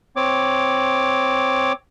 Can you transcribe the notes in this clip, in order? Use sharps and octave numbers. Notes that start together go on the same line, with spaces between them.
C4 C#5 D6